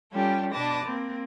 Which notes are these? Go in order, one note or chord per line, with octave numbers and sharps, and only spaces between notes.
G3 C#4 F4 G4 A4
B2 D4 B4 A5 D6 A#6
A#3 C4